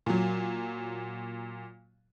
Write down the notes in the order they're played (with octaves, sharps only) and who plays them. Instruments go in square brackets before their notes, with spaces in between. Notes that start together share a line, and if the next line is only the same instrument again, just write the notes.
[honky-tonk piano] A#2 F#3